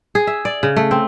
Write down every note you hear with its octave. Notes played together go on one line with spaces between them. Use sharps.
G#4
E5
D5
C#3
A3
C4